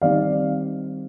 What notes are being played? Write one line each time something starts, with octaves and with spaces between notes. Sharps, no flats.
D#3 G3 C4 D#4 D5 F5